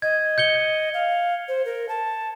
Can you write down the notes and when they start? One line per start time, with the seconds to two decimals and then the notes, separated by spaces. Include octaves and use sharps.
0.02 D#5 G#6
0.38 G6 C#7 G7
0.94 F5
1.48 C5
1.65 A#4
1.89 A5